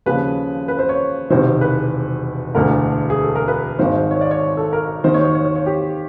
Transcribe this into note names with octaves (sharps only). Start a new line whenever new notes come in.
D#2 C#3 F3 B4
B4
C5
C#5
E1 E2 C3 D#3 C5
B4
E1 D2 D3 A#4
G#4
A4
A#4
B4
G#1 G#2 D#3 C5
C#5
D5
C#5
A4
A#4
D#2 D#3 C5
C#5
C#5
C#5
C#5
C#5
G4